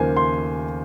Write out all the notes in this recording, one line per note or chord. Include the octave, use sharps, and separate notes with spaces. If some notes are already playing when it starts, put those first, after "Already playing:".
Already playing: D#2 C#3 F3 A#3 C5 G#5
C6